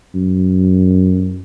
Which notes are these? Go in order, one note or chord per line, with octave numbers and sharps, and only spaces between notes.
F#2